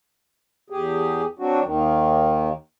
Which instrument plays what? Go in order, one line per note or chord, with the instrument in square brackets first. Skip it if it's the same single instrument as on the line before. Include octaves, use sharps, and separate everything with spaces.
[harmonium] E2 G4 G#4
F#3 C4 D4 F#4
D#2 D#3